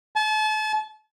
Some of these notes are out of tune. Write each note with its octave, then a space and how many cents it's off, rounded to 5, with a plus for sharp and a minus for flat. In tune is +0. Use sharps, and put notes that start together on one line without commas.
A5 -35